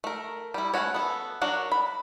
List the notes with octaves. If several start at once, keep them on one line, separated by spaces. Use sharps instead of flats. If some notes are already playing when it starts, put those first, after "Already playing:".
A3 A#4
G3 E4
A3 C4 C#4 F#4 C#5
B3 A4
F#3 D4 F#4 A#4
B5